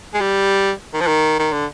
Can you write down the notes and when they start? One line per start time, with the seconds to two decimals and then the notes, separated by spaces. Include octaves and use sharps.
0.14 G#3
0.21 G3
0.94 D#3
1.01 F3
1.07 D#3
1.39 D#3
1.53 D3